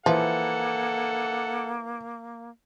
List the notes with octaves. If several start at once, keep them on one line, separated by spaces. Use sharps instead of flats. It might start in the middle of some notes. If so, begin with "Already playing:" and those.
E3 F3 A#3 A4 F#5